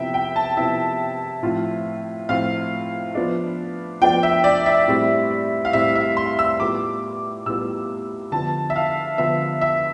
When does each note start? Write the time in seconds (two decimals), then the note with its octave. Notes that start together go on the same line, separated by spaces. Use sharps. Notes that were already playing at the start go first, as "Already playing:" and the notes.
Already playing: C3 F3 B3 E4 E5 G5
0.14 G5
0.36 A5
0.57 C3 F3 B3 E4 E5
1.43 A2 F3 C4 F4
2.29 A2 F3 C4 F4 F5
3.15 F3 B3 D4
4.01 F3 B3 D4 G5
4.23 E5
4.44 D5
4.66 E5
4.88 A2 G3 C4
5.65 F5
5.73 A2 G3 C4 E5
5.95 E5
6.17 C6
6.39 E6
6.60 A2 G3 B3 F4 D6
7.46 A2 G3 B3 F4 E6
8.32 D3 F3 B3 A5
8.70 E5
8.76 F5
9.18 D3 F3 B3 E5
9.61 E5